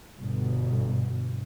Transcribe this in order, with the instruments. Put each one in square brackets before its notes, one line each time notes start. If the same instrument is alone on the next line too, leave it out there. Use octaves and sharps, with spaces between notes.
[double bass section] G1 B2